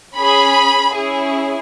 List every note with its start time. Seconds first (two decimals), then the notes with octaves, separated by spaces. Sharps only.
0.16 C#4 G#4 B5
0.94 C#4 E4 G#4